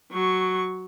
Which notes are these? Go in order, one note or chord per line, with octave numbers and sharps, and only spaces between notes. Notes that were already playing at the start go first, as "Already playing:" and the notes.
F#3 C#6